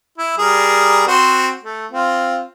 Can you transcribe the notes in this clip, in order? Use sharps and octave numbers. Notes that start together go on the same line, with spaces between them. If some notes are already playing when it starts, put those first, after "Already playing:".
E4
G3 G#4 A#4
C4 F#4 C5
A3
C4 F4